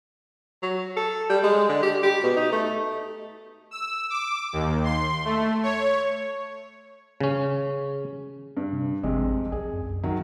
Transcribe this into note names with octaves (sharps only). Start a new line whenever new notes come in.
F#3
A4
G3
G#3
D3
G4
G4
B2
D#4
A3
E6
D6
D#2
C6
A3
C#5
C#3 C#4
G2
C3
G#1 F2 C3 G#3
B1 G#4
F#2
D#3 F#3